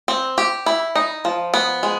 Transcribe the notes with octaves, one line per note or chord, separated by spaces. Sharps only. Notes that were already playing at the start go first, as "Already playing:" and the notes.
C4
G4
E4
D#4
F3
B3
G#3